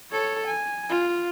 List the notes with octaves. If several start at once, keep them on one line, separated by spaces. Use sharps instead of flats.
A4 C#5
G#5
F4